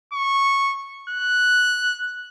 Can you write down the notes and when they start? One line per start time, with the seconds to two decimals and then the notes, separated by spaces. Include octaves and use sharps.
0.13 C#6
1.10 F#6